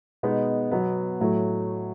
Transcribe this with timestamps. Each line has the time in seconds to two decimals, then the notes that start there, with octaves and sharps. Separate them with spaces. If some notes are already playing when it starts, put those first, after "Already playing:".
0.23 B2 G#3 B3 D#4
0.71 B2 F#3 B3
1.20 A2 F#3 A3